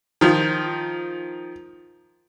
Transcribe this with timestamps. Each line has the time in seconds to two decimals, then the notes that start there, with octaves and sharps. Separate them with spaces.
0.21 D#3 F3